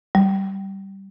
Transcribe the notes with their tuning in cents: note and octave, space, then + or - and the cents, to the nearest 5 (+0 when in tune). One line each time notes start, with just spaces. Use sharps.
G3 -10